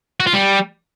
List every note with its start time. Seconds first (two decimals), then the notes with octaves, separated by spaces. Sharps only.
0.20 F#4
0.27 F4
0.34 G3